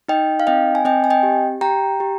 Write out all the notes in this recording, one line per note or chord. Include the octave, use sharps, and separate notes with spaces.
D#4 D#5 G5
F5
C4 D#5 G5
G#5
C4 D#5 G5
G#5
D#5 G5
G4
G4 G5 A#5
G4